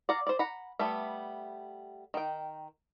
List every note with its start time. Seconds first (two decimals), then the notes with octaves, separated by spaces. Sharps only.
0.09 D5 F5 F#5 A#5
0.27 C5 D5
0.39 F#5 A#5 B5
0.79 G3 A3 B3 E5
2.14 D#3 G5